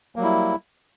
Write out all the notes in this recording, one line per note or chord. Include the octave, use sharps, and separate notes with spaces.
F#3 G3 A#3 E4